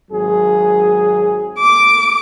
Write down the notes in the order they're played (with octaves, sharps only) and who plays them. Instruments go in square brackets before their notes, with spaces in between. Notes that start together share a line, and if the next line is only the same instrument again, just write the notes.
[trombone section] G#1 F#3 G#4
[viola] D6